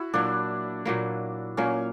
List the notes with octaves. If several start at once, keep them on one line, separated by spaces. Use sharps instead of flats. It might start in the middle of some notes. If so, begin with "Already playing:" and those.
Already playing: E4 F#4
A#2 F#3 A#3 D4
A#2 F#3 A#3
A#2 F#3 A#3 C#4